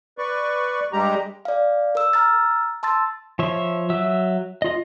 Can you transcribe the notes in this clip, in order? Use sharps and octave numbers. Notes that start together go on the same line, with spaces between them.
B4 D5 C#6
G2 G3 G#3 G4 A#5
D5 F5
A#4 E6
A#5 E6 F6 A6
A5 C6 E6 A6
F3 C#5 E5
F#3 E5 E6
F4 D#5